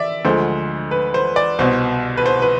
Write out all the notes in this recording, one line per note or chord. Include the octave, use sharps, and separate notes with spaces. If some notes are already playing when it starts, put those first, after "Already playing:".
Already playing: D5 E5
D2 D3 F3 G#3 C5
B4
C5
D5
C2 B2 B3 C5
B4
C5
B4